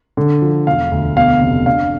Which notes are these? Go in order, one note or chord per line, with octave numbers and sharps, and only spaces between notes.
D3
F3
E1 F5
D2
B2 F5
F1
D4 F5